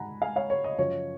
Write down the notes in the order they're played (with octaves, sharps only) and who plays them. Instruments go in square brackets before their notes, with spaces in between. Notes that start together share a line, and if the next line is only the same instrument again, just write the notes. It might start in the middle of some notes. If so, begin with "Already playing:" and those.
Already playing: [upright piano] G#2 D#3 F#5 G#5 A#5 B5
F5 G#5
C#5 F5
C#5
D#5
F#2 C#3 F3 C#5